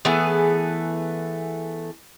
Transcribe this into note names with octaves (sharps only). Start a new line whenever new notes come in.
E3 A3 B3 G#4